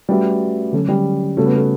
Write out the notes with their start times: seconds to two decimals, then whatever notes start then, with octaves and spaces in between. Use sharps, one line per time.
0.09 G3 A3 C#4 F#4 B4 E5
0.73 D3 F#3 A3 C#4
0.89 G3
1.37 C#3 G3 A3 C#4 F#4
1.46 B3
1.55 A3